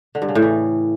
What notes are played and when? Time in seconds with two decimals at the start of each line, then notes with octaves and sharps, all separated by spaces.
0.15 D3
0.22 G2
0.29 C#3
0.35 A2
0.42 E3